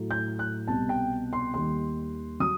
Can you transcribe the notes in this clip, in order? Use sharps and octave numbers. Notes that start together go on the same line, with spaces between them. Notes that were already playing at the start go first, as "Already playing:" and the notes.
Already playing: A2 F#3
G6
F#6
C2 B2 G3 A5
G5
C6
D#2 D#3 G3 C6
F#3 D#6